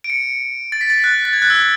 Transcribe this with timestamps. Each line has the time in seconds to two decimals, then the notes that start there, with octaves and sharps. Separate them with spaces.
0.04 D7
0.10 C#7
0.72 A6
0.81 B6
0.90 A6
1.04 F#6
1.25 A6
1.33 G#6
1.42 F#6
1.50 E6